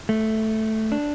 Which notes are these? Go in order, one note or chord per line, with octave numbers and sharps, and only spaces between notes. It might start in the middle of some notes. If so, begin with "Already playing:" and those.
A3
D4